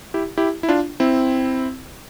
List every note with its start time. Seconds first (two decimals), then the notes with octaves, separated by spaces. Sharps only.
0.14 E4 G4
0.38 E4 G4
0.63 E4
0.69 D4 F4
1.00 C4 E4